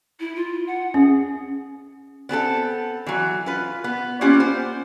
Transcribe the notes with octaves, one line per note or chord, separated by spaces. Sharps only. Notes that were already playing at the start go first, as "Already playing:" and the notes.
E4
F4
F#5
C#4 G#4
B3 C4 G#4 A4
E3 F#3
F4 B4
B3
A#3 B3 C#4 F4 G4
C5